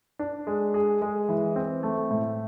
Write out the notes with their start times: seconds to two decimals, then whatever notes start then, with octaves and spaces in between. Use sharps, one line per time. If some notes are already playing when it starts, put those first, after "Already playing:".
0.19 D4
0.47 G#3
0.74 G#4
1.02 G#3
1.29 E3
1.56 C4
1.83 A3
2.10 A2